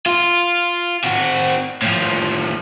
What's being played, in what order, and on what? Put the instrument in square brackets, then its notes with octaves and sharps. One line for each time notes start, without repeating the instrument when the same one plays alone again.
[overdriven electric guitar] F4
C4 F#4
A2 F3